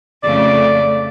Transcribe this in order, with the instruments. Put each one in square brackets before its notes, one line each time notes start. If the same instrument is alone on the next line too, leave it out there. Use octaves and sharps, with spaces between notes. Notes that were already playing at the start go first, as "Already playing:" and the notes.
[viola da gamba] F2 C#3 A3 [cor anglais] D5